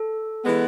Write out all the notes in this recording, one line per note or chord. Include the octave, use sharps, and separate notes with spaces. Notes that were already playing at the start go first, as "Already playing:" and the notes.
Already playing: A4
E3 G#3 B3